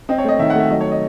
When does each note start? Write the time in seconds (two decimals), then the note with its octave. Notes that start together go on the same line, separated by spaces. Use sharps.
0.09 C4 D#5
0.18 C#5
0.24 A3 D#5
0.39 D#3 E5
0.50 F#5
0.55 A3 E5
0.70 F#3 D#5
0.81 C#5
0.91 D#5